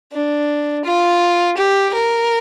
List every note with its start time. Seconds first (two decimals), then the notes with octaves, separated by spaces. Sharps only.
0.12 D4
0.85 F4
1.57 G4
1.93 A#4